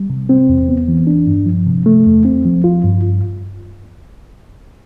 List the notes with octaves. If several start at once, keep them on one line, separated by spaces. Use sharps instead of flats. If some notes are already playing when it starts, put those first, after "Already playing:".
Already playing: G3
C3
C4
E2
B3
E3
D4
G2
F3
C3
A3
E2
C4
F3
F4
G2